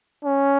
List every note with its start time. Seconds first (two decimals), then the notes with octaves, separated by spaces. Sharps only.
0.24 C#4